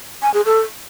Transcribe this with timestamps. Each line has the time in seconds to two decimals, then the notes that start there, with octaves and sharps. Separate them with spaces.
0.22 G#5
0.34 G#4
0.46 A4